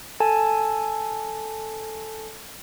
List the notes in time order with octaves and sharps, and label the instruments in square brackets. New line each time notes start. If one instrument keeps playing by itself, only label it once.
[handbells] A4 G#5 A5